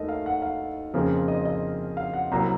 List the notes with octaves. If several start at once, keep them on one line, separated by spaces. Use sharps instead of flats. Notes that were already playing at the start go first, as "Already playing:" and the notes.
Already playing: D#2 D#3 A3 A#4 D#5
F5
F#5
F5
F2 C#3 F3 A#3
D#5
D#5
F5
F#5
C2 C3 F#3 A#3 A#5